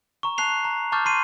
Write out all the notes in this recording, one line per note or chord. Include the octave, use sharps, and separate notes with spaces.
A#5 C#6
A5 F#6 C7 F7
A#5
A5 C#6 D6 F6 G6 A6
A#5 C6 C7 D#7